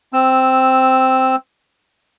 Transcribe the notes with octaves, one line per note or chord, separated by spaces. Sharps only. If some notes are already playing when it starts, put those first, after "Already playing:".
C4 E6